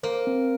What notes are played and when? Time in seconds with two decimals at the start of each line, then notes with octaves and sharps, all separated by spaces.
0.03 A#3 C5
0.27 C4